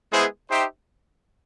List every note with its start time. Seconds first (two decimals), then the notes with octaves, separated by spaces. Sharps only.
0.11 G#3 B3 E4 G#4 C5
0.50 D#4 G4 C5 E5 G5